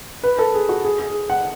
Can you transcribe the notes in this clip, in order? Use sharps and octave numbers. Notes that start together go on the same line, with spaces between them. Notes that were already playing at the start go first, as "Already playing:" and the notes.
B4
A4
G#4
F#4
G#4
G#4
F#5